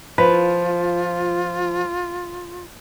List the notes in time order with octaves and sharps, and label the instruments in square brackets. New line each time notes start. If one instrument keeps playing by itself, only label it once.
[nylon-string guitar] F3 [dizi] F4 [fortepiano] B4